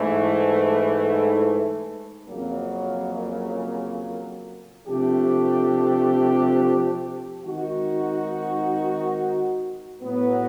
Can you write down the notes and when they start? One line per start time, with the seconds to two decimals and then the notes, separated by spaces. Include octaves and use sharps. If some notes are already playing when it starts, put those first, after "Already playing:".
Already playing: G#2 E3 A3
2.28 F2 C#3 F#3 A#3
4.87 C3 F3 A3 D4 G4
7.44 D#3 G#3 C4 D#4 F#4
10.03 A2 F#3 B3